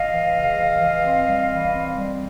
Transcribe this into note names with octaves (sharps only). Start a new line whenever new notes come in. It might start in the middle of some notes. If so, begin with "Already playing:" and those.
Already playing: D#5 F5
E3
C#3
E3
E3
C4
G3
E3
C4
G3